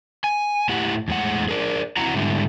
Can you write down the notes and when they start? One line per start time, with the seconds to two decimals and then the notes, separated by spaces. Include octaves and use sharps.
0.24 G#5
0.69 A2 E4 G4 F#5
1.08 E2 A2 G#3 F#5
1.49 G#4 A#4 D5
1.97 C4 E4 F#4 F#5 A#5
2.15 G#2 D3 G3 E4